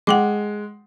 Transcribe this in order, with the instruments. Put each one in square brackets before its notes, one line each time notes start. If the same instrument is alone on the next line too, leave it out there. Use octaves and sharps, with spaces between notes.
[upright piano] G#3 [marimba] F#5 G5 D6